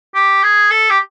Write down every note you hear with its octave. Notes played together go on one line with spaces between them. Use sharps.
G4
G#4
A4
G4